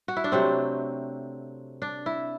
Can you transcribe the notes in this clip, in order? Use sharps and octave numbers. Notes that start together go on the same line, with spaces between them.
F#4
E4
D4
C3 F#3 A3 C4
D4
E4